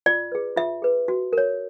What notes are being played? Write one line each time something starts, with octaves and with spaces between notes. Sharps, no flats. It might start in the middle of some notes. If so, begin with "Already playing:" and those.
F4 D5
G#4 B4
F4 E5
G#4 B4
F#4
A#4 C#5